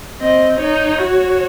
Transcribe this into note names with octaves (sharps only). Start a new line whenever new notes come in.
C4 D#5
D#4 C#5
F#4